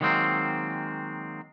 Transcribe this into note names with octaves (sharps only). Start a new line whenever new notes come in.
D#3 F#3 G#3 A#3 C4